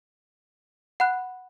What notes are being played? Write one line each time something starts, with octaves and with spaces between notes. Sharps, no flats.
F#5 B5 F#6